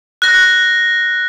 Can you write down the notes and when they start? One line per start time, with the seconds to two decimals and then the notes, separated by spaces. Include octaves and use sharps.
0.22 F#6 A#6